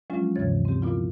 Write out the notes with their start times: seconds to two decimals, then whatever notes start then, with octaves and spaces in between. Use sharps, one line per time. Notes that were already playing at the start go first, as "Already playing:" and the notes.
0.10 F3 F#3 G#3 C#4 D4 F4
0.36 D2 G2 C3 E3 C#5 A6
0.65 C4 G4
0.82 A#2 F3 B3 E4 F4